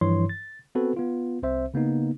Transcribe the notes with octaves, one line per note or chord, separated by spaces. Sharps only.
G2 E3 F3 E4 C#5 C6
A6
B3 C4 F#4 A4 B4
B3 F4
C2 C4 C5 E5
C#3 A#3 B3 D#4